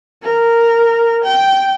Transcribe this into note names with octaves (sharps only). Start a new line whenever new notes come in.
A#4
G5